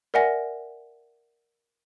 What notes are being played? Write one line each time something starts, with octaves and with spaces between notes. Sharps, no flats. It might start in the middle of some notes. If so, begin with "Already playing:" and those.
A#4 D5 E5 F#5 G#5 A#6